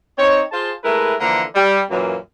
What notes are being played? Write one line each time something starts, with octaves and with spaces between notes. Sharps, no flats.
C4 D#4 C#5
F4 G#4 C5 A5
G#3 A3 E4 A#4 B4
D3 E3 F3 A#3 A#5
G3
F#2 A#2 E3 F#3 A#3